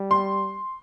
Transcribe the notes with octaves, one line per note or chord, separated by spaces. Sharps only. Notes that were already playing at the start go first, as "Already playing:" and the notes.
Already playing: G3
C6